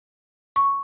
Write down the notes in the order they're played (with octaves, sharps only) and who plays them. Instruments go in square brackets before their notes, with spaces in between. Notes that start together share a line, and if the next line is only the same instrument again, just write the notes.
[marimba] C#6